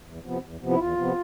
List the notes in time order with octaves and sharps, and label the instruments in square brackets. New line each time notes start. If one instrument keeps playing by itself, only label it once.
[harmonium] E2
C3 F3 B3
E2
C3 F3 B3
E4
E2 F4
C3 F3 B3